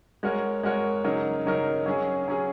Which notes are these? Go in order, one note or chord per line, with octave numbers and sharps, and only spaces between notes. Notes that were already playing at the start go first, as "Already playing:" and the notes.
G#3 F#4 A#4 C#5
G#3 F#4 A#4 C#5
C#3 F#3 D#4 A#4
C#3 F#3 D#4 A#4
F#3 C#4 G#4
F#3 C#4 G#4